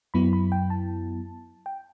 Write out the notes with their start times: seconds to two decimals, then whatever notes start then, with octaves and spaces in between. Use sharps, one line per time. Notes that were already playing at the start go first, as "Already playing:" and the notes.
0.14 F#2 F#3 B3 E4 B5
0.33 B5
0.52 G5
0.70 A5
1.66 G5